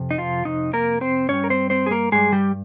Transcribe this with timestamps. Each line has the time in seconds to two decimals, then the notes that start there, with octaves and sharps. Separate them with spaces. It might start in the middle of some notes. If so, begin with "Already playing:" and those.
Already playing: F2 C3
0.11 D#4
0.18 F3 F4
0.45 F2 C3 D#4
0.73 A#3 A#4
1.01 C4 C5
1.29 G2 G3 C#4 C#5
1.44 A#4
1.50 C4 C5
1.70 C4 C5
1.86 G#4
1.91 A#3 A#4
2.12 G2 G3 G#3 G#4
2.32 G3 G4